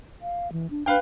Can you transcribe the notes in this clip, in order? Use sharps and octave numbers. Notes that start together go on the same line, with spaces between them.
F5
E3
D4
D4 B4 F5 G5